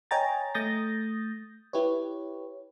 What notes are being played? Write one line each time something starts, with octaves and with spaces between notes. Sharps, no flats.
C#5 D#5 G5 G#5 A#5 A6
A3 D#6 G6 A6 A#6
E4 G4 B4 C#5